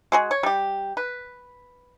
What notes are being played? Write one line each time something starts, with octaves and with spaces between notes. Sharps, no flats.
G#3 F#4 G#4
C#5
G3 G4
B4